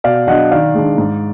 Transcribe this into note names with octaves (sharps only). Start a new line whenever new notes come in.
B2 D5 F5
F#3 D4 D#5 F#5
D#3 D5 F5
G#3 D4
G#2